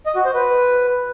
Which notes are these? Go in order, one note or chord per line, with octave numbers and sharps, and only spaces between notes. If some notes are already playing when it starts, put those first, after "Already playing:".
D#5
F#4
C5
B4